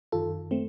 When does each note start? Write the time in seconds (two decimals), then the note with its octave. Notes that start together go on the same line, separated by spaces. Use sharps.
0.12 F#2 D#3 F4 A4
0.51 A3 C4